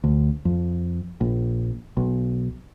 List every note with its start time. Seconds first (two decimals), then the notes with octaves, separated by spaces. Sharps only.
0.04 D2
0.45 F2
1.21 A#1
1.97 B1